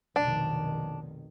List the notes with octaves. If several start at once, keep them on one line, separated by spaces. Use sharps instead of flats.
F1 B1 D#3 D4